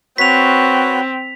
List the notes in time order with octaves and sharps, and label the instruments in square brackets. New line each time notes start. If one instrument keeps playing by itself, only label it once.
[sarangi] C4 [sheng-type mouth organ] F#4 B4 C#5 [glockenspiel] B6 F7